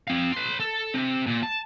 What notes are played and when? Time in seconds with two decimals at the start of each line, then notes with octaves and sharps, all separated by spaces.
0.07 C4 F5
0.32 B4 C6
0.60 A4
0.94 C3
1.26 A#2
1.43 A5